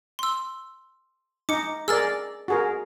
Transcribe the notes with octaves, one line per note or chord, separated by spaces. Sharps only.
C6 E6
D#4 D6 C#7
G#4 A#4 D5 E6 F6 A6
F#4 G#4 A#4